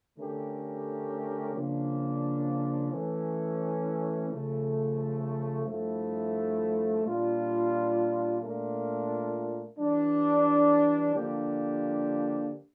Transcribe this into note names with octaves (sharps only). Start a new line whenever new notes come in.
D3 A3 C#4 G4 A#4
C#3 F3 A#3 D4
E3 A3 C#4
C#3 F3 A3
G2 F3 A3 E4
A#2 G3 D4 F4
A#2 A3 D4 F4 A#4
E3 G3 D4
D3 F3 A#3 D4 G4